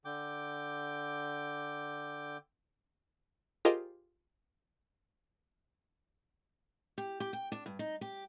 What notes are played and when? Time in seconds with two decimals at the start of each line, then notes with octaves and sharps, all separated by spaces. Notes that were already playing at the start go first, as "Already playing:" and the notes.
0.05 D3 G5 D6
3.65 F4 G4 G#4 A#4 C5 D#5
6.98 G4
7.20 G4
7.33 G5
7.52 D4
7.66 G2
7.79 D#4
8.01 G4